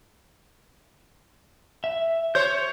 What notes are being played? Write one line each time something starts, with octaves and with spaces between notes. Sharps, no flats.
E5
C5 C#5 G6